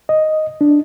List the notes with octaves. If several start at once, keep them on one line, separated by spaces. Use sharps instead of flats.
D#5
D4